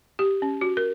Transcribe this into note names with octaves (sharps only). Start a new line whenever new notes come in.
G4
C#4
F#4
A#4